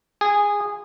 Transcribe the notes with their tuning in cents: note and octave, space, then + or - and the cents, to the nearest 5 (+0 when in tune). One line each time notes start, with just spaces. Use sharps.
G#4 -15